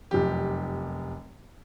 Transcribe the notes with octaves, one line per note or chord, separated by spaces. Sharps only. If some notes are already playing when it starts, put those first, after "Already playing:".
F1 F#2 G4